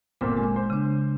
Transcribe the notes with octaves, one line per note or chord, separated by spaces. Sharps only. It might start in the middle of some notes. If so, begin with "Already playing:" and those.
G1 A#2 C4 D6
G#3
C5
C#3 D4